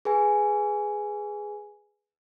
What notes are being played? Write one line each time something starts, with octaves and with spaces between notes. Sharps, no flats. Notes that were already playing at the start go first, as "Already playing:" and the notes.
G#4 B4 G#5